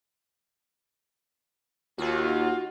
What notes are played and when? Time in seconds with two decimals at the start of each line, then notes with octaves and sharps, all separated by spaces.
1.98 D#2 F4 F#4